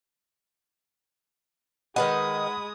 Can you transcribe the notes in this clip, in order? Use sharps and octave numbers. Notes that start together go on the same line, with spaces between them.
D#3 G#3 B4 D#5 F#5 B5 D#6